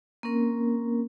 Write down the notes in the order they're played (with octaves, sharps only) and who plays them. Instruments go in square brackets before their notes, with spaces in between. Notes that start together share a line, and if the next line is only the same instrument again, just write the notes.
[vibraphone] A#3 C4 C#4 A#4